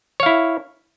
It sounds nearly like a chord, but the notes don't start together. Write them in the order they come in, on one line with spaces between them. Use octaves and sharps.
C#5 F5 E4